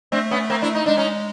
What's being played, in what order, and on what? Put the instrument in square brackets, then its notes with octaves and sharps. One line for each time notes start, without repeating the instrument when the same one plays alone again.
[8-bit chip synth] A3 [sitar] C4 D4
[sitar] B3 C#4
A#3 C4
D4 E4
D#4
[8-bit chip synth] G#3 [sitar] D4
[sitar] C#4 D#4